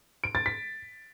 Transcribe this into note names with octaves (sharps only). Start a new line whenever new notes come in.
D7
A6
B6